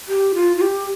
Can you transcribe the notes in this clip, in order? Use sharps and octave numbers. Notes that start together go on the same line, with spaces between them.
G4
F4
F4
G4